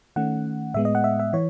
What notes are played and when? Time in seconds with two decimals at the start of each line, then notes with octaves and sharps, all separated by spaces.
0.16 D#3 A3 C#4 F#5
0.74 A2 G#3 B3 E5
0.85 D#5
0.95 F#5
1.04 E5
1.20 E5
1.33 E3 C#5